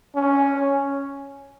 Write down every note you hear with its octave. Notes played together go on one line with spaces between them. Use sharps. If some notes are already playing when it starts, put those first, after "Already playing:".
C#4